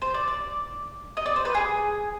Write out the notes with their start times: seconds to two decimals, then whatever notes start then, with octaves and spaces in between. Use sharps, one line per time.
0.02 C5
0.14 D5
0.28 D5
1.17 D#5
1.26 D5
1.36 C5
1.45 B4
1.55 G#4